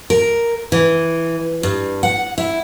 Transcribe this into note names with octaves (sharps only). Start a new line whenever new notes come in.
A#4
E3
G2
F#5
E4